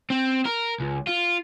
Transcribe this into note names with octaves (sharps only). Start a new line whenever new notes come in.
C4
A#4
C#2
F4